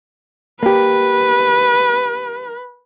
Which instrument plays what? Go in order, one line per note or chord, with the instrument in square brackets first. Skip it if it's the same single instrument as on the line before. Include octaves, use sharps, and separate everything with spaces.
[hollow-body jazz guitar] A#3 G4 [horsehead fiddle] B4